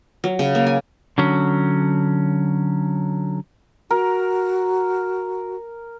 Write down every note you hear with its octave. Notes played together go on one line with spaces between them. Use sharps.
F#3
C#3
A#3
G#5
D3 F#3 C#4
F#4 A#4